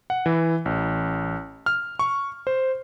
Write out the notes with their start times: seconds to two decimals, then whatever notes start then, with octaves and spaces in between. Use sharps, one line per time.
0.10 F#5
0.26 E3
0.65 A1
1.66 F6
1.99 C#6
2.47 C5